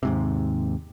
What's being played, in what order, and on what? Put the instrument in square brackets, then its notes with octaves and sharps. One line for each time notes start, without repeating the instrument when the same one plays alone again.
[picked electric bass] D#2 G#2 C3